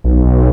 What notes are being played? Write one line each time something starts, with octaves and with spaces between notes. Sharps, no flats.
B1